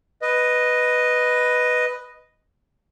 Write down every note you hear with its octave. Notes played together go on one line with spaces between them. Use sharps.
B4 D#5